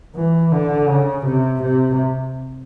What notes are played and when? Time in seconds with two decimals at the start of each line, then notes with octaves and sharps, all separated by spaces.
0.15 E3
0.52 D3
0.89 C#3
1.26 C3
1.62 C3